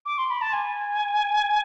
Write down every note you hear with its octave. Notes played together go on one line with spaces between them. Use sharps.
D6
C6
B5
A5
G#5